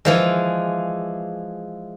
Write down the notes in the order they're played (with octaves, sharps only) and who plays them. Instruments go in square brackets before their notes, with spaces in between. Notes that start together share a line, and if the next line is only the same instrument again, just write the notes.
[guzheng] E3 F3 G#3